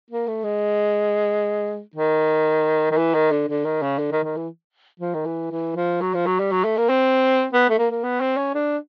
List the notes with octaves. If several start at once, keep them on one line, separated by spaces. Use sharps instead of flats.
A#3
A3
G#3
D#3
D#3
E3
D#3
D3
D3
D#3
C#3
D3
D#3
D#3
E3
F3
D#3
E3
E3
F3
F#3
F3
F#3
G3
F#3
A3
A#3
C4
B3
A3
A#3
A#3
B3
C4
C#4
D4